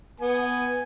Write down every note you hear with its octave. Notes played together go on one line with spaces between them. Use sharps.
B3 G#5